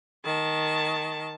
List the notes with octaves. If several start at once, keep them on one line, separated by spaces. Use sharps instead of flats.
D#3 A5